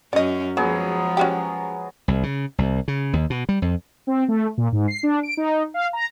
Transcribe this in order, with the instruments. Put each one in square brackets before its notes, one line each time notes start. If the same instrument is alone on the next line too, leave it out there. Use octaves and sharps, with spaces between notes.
[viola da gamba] F#2 C#4 [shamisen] D5 D#5
[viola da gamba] F3 G#3 [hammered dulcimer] F#3 B3 G#4 [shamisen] A#3
[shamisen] C#4 F#4 G4
[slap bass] C2
C#3
C2
C#3
D#2
B2
G3
F2
[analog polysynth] C4
A3
A#2
G#2
C7
D4
D7
D#4
F5
A#5